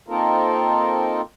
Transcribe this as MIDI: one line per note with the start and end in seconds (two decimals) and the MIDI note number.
0.08 1.21 58
0.08 1.21 60
0.08 1.21 63
0.08 1.21 65
0.08 1.21 69
0.08 1.21 70